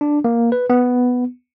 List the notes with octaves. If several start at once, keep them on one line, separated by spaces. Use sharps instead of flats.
D4
A#3
B4
B3